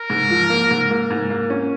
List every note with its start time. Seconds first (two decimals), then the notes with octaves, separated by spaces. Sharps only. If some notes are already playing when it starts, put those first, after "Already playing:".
Already playing: A#4
0.10 G#2
0.30 F3
0.50 A#3
0.71 G#2
0.91 A#3
1.11 G#2
1.30 A#3
1.50 C#4